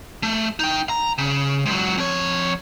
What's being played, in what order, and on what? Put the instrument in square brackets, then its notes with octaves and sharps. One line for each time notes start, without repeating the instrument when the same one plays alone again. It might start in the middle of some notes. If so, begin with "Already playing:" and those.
[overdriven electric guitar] A3
D#4 G5
A#5
C#3
G#2 F#3
F2 C#5